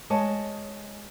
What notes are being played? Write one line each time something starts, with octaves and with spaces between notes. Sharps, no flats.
G#3 C#5 D#5 A5